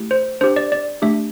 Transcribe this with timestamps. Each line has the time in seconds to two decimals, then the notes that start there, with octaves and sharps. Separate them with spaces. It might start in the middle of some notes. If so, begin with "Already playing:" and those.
Already playing: A3 E4 G4
0.11 C5
0.41 D4 G4 C5
0.56 D5
0.72 D5
1.02 A3 D4 G4 E5